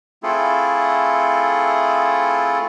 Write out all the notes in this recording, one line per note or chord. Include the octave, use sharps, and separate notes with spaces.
A3 C4 E4 F4 G#4 A4